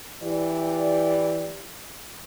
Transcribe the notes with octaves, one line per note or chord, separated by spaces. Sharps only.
E3 G4 D5